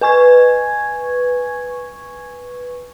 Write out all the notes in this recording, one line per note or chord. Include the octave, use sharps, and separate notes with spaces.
B4 G#5 C#6 G#6